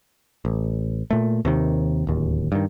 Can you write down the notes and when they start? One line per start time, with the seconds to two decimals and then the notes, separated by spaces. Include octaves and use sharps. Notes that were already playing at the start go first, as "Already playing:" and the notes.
0.45 A1
1.11 A#2 A3
1.45 D#2 C3 D#3
2.07 D1 D#2
2.52 G2 D#3